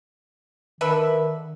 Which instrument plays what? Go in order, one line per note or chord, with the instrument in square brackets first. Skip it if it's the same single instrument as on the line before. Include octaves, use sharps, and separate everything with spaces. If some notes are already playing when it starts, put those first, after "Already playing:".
[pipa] D3 B4 E5 [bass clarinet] D#3